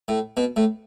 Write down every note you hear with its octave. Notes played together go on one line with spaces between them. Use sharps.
A2
B2
A2